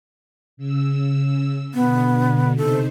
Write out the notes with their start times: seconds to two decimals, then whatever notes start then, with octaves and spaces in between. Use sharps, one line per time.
0.57 C#3 E6
1.74 B2 D3 B3
2.57 C3 D#4 A4 C5